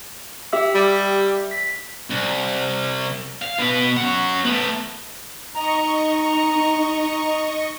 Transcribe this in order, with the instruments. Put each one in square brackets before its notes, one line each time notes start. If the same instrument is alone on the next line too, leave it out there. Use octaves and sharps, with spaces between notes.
[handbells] G4 E5 E6
[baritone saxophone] G3
[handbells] B6
[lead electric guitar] C2
F5
B2 B4
C#4 F#5
A3 B3
[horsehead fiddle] D#4 [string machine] D#5 C#6 [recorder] A#5